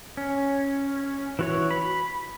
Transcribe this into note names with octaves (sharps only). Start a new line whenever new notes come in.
C#4
E3 F#4 C#5
B5